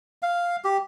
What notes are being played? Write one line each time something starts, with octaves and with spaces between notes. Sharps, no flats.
F5
G4